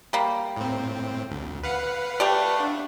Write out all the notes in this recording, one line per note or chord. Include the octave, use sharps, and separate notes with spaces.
G3 A#3
A2 C4
D2
B4 F5 F#5
A3 G4 D5
D4